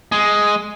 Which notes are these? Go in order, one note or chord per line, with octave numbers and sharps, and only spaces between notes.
G#3